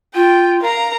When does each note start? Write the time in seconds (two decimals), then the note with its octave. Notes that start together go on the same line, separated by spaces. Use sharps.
0.15 F4 G5
0.62 A#4 F5 A#5